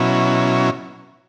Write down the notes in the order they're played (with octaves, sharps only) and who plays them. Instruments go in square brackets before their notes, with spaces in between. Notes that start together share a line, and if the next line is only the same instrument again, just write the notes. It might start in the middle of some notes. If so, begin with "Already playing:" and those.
Already playing: [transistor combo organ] B2 F#3 C#4 E4